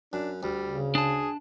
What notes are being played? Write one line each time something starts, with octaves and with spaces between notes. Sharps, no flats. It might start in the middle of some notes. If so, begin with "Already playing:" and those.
F#2 D4
D2 G3
C#3
D4 G#4 A5